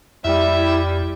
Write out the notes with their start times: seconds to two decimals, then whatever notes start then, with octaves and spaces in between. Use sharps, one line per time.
0.25 F2 G3 E4 E5